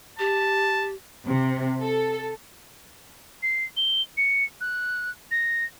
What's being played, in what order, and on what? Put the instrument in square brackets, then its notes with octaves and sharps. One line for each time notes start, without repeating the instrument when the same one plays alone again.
[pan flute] G4 [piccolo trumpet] A5
[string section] C3
A4
[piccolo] C7
G7
C#7
F#6
A#6